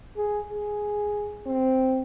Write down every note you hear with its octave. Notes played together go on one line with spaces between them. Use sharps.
G#4
G#4
C4